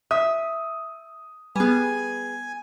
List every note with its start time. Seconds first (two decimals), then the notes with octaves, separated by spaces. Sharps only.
0.11 E5 D#6
1.56 G3 B3 G#4 B4 G#5